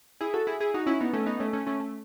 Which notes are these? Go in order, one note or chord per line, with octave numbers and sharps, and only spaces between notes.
E4 G#4
F#4 A4
E4 G#4
E4 G#4
D#4 F#4
C#4 E4
B3 D#4
A3 C#4
B3 D#4
A3 C#4
A3 C#4
A3 C#4
A3